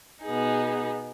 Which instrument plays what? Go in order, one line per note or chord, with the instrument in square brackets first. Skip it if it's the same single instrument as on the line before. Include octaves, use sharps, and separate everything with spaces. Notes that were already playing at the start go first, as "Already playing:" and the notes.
[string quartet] B2 B3 D#4 G#4